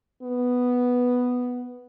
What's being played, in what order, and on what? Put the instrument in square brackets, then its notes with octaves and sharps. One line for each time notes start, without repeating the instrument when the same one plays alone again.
[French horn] B3